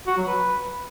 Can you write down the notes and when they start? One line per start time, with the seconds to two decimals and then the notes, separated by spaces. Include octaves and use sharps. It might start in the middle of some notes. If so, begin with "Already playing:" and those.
0.07 F#4
0.17 F#3
0.28 B4